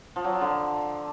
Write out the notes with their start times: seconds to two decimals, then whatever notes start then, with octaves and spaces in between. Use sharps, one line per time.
0.16 F3
0.24 F#3
0.33 F3
0.41 D3